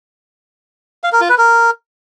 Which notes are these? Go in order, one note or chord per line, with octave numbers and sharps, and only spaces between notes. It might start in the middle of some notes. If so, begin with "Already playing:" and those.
F5
A#4
F4
B4
A#4